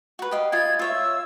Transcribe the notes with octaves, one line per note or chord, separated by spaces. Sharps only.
F#4 B4
G4 D#5 F5
F4 D#5 G#5 G#6
F4 C#5 E5 E6